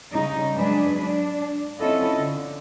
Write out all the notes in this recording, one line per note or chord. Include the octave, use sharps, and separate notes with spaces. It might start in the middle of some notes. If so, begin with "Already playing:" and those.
C#3 G3 D#4
G#2 F#3 D4 G#4 B4
D4
C4 C#4 E4 F4 A4 D#5
D3